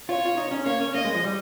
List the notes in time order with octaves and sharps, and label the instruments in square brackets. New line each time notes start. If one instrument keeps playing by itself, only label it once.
[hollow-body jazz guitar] F4 [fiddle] C#5
[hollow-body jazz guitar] F4
D#4
C#4
[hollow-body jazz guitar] A#3 [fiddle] C#5
[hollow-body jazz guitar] C#4
[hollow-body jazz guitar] A#3 [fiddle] D#5
[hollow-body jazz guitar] G#3
F3
G3